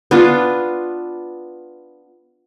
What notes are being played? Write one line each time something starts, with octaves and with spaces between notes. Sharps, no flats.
B3 D4 F4